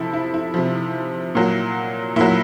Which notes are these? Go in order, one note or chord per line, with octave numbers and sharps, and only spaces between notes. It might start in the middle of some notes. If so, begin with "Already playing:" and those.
Already playing: C3 F3 E4 A4
E4
E4
C3 F3
A#2 F#3
A#2 F#3 E4